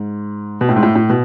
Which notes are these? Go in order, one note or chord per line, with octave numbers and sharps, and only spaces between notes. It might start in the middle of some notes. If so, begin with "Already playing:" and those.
Already playing: G#2
B2
A2
G#2
A2
A2
B2